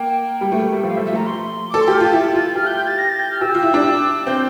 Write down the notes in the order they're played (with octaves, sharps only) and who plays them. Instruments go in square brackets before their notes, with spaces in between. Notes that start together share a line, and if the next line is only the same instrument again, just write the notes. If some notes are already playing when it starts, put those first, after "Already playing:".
Already playing: [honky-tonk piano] A#3 [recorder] G5
[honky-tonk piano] G3
A3
A3
G3
[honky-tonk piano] F3 [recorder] F5
[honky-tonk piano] F3 [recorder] E5
[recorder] E5
[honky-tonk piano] A3 [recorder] A#5
[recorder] C6
[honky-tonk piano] A4 [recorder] D6
[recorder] C6
[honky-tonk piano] G4 [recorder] F6
[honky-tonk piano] F4 [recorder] A6
[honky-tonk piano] E4
F4
[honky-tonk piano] G4 [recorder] F6
[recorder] G6
G6
A6
A#6
A6
G6
F6
[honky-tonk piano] G4 [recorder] E6
[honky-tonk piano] F4
E4
D4
[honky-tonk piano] C4 [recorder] G6